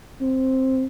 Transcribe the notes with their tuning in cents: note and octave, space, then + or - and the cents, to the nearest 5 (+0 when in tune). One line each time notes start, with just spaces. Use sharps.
C4 +5